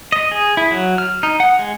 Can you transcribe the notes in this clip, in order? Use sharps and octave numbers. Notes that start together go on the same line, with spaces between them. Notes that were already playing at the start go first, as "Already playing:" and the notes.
D#5
G#4
E4
F#3
F6
D#4
F#5
G#3